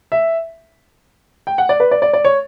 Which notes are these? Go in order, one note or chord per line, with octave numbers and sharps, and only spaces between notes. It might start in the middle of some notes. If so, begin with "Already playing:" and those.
E5
G5
F#5
D5
B4
D5
D5
D5
C#5